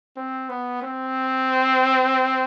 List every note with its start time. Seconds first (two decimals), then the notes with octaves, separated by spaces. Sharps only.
0.17 C4
0.49 B3
0.82 C4